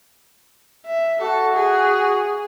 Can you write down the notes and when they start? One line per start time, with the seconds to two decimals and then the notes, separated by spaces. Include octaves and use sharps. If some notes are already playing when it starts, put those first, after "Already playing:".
0.87 E5
1.21 F#4 A4
1.55 G#4